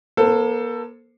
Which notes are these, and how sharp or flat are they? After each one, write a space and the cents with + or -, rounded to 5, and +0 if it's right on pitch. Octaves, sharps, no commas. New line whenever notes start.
A#3 +40 A4 +20 C5 +0